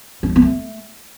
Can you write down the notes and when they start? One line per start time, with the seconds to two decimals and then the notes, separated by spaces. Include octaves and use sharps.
0.23 C#4
0.29 D#4
0.36 B3
0.42 A3